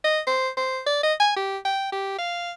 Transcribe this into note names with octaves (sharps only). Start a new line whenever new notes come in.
D#5
C5
C5
D5
D#5
G#5
G4
G5
G4
F5